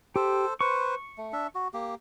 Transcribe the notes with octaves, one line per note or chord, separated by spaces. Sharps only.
G4 A4 C5
B4 C5 C#6
A3
D4 E5
F#4
A#3 G4